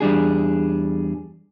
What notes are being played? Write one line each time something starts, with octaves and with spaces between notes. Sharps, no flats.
E2 G3 D4 G#4